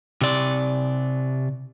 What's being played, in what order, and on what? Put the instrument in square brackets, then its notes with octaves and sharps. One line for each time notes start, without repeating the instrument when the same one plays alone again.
[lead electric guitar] C3 D5